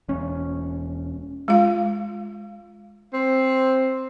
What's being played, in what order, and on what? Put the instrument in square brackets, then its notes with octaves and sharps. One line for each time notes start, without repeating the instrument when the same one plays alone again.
[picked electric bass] E1 C#4
[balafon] G#3 F4 F5
[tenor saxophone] C4